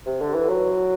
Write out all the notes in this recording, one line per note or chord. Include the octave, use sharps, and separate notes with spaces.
C3
D3
E3
F#3